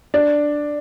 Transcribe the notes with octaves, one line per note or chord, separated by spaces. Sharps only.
D4